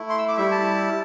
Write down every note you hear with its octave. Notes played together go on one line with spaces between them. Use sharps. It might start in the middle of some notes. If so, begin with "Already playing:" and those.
Already playing: A3 E4
C6
E6
D6
G3 E4 E5
A5